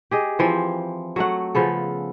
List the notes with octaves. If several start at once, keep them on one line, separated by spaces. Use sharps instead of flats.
G4 G#4 D#5
E3 F3 C4
F#3 A3 F#5
C#3 F3 B3 A4